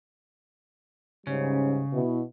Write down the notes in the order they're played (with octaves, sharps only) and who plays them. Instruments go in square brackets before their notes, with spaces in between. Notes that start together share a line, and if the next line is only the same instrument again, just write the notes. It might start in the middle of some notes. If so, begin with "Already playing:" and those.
[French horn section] G#2 G3 C#4 [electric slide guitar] C#3
[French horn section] B2 E4